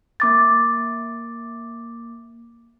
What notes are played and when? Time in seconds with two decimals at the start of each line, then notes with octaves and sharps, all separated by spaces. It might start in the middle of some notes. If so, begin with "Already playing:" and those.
0.20 A#3 D6 A6